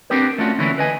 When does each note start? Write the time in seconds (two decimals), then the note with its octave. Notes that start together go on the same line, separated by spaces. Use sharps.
0.10 B3 C4 D4 G4 A#4 B4
0.38 A3 C#4 D4 F4 F#4
0.59 D3 E3 A#3 C#4 E4
0.78 B4 D#5 G#5